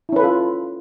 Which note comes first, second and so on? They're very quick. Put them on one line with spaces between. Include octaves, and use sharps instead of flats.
E4 C#4 B4 A4 F4